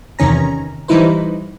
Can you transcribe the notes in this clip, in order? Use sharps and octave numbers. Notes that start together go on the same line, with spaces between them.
E2 C3 D#3 C#4 A#5
E3 G3 D#4 E4 B4 C5